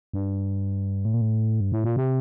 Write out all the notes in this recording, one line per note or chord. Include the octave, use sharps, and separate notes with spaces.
G2
A2
A#2
A2
G2
A2
A#2
C3